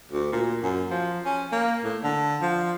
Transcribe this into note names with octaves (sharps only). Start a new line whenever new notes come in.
D2
A#2
F#2
F3
C#4
A#3
A2
D3
F3